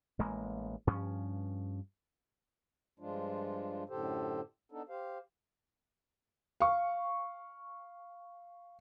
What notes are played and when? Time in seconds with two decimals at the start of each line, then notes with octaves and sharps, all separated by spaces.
0.19 A1 G#3 A#3
0.87 G2 F3 C#4
2.99 G2 F3 G#3 D4 F4
3.89 F#2 A2 D3 G4 A4 C5
4.72 B3 D4 D#4 A4
4.89 G4 C5 F5
6.60 F5 C#6